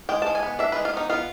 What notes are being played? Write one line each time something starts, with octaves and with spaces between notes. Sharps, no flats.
G#3 G5
G#3 A5
G#5
B3
D4 E5
G#3 B4
F4
B3 D#4
B3 F4